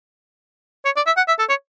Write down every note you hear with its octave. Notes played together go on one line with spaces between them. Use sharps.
C#5
D5
E5
F#5
E5
A4
C#5